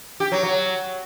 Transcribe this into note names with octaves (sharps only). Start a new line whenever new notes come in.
G4
F#3
F#3